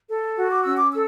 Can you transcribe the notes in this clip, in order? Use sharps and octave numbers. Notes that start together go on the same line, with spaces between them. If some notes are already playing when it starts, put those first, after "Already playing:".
A4
F#4
D6
C#4 E6
D6
A4 E6